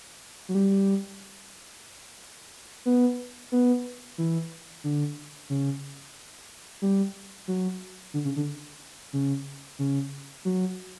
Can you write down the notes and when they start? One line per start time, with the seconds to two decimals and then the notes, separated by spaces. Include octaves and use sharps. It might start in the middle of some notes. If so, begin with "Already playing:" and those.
0.49 F#3
0.55 G3
2.86 B3
3.52 B3
4.18 E3
4.84 D3
5.50 C#3
6.82 G3
7.48 F#3
8.14 D3
8.25 C#3
8.36 D3
9.13 C#3
9.79 C#3
10.45 F#3